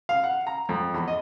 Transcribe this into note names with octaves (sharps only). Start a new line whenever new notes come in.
F5
F#5
A#5
F2
E2
D#5